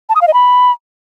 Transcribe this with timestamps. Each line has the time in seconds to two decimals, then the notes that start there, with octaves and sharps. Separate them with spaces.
0.09 A5
0.15 D#6
0.21 F5
0.27 D#5
0.34 B5